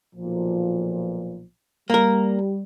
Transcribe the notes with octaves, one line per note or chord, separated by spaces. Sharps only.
B1 A#2 F3
G3 A#3 A#4